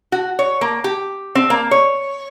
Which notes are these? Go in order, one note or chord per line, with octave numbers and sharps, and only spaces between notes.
F#4
C#5
A#3
G4
C4
A#3
C#5